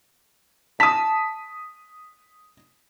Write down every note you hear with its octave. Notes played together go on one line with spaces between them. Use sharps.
A5 D#6 B6